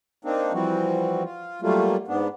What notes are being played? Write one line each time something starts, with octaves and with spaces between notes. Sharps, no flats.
A#3 C4 D4 D#4
E3 F3 G3 C4 F#4
F4
F#3 G3 A3 A#3 F4
G#2 B3 D4